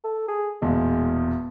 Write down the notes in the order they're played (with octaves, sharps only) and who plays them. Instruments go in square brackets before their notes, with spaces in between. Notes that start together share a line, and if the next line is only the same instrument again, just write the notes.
[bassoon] A4
G#4
[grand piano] E1 E2 A#2 [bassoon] G#3